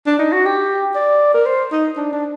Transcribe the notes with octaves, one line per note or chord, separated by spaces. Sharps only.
D4
D#4
F#4
G4
D5
A#4
C5
D#4
D4
D4